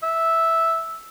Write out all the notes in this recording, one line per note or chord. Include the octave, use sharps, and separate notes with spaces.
E5